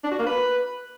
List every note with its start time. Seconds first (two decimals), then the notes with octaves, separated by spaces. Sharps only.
0.04 D4
0.11 F#4
0.19 A#3
0.26 B4